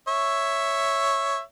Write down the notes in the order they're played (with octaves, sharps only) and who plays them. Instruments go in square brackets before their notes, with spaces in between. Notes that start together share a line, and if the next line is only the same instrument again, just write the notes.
[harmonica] C#5 E5